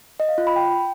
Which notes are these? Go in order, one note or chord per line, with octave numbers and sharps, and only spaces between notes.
D#5
F5
F4
B5
G5